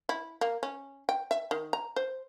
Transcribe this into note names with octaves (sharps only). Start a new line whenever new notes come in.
E4
A#3
C#4
G5
E5
D#3
A#5
C5